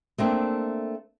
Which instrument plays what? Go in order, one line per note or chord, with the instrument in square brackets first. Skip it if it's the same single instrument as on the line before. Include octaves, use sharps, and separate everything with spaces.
[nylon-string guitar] A3 A#3 C4 D4